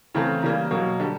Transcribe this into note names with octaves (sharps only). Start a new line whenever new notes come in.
C#3 E3 A3 C4 A#5
C#3 E3 G3 A#3 A#5
B2 F#3 A#3
D3 G3